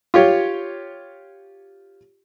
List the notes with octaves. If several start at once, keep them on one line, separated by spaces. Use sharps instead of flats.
F4 G4 C#5